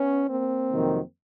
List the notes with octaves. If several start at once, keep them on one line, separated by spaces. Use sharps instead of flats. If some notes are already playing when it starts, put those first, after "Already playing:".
Already playing: B3 C#4
A#3 C4
F2 C3 D#3 F#3